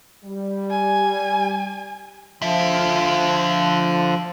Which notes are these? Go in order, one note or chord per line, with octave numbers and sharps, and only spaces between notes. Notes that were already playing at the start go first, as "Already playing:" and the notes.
G3
G#5
D3 F3 E5